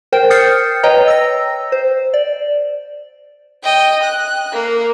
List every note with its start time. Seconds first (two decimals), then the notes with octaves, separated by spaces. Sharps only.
0.12 A#4 C5 G5
0.30 D#6 F6 G6 A6 C7 C#7
0.83 B4 C#5 D#5 G5 A#5
1.08 E6 A#6
1.72 C5
2.14 D5
3.63 D#5 G5
4.04 F#6
4.53 A#3